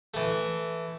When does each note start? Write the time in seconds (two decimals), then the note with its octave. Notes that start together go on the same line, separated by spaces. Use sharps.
0.14 E3 A3